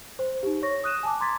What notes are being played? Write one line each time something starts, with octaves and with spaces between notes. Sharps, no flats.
C5
D#4 G4
C#5 C#6 A#6
D#6 F#6 D#7 E7
G#5 A5 D6
A#5 C6 D6 G#6 A6 B6